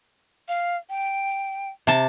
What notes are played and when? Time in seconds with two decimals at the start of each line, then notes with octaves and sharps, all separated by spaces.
0.48 F5
0.90 G5
1.87 C3 A5